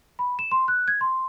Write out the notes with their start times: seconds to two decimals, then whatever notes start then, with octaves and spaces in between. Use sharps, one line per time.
0.19 B5
0.39 E7
0.52 C6
0.68 F#6
0.88 G#6
1.01 C6